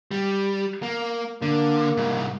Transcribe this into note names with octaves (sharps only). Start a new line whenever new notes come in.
G3
A#3
D3 A#3
C2 G#2